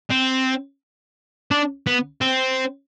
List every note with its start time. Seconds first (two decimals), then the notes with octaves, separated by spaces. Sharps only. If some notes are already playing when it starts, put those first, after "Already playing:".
0.10 C4
1.51 D4
1.87 B3
2.21 C4